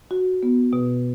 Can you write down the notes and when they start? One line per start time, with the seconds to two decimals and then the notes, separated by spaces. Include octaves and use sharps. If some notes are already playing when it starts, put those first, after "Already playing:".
0.11 F#4
0.43 B3
0.73 B2